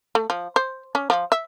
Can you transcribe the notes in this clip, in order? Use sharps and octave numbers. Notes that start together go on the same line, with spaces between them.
A3
F3
C5
C#4
F3
E5